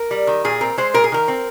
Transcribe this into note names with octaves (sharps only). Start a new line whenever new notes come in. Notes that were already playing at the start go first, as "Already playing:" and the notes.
Already playing: A#4
G3
D#3
A#2 G#4
C4 A#4
G#3 C5
A#2 A#4
G#4
D#3 A#4
C4